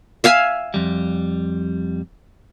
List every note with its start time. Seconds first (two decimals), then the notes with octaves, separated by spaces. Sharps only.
0.24 E5 F5 G#5
0.74 F2 G3